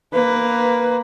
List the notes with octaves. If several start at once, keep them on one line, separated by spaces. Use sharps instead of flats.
A#3 B4